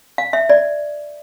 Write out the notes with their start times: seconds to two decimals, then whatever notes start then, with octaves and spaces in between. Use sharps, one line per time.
0.18 F5
0.33 E5
0.49 D5